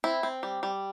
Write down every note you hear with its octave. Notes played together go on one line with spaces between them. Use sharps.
C4 E4
C4
G3
G3